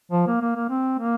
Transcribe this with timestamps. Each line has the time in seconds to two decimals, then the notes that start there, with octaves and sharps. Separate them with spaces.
0.12 F3
0.27 A#3
0.41 A#3
0.56 A#3
0.70 C4
0.99 A#3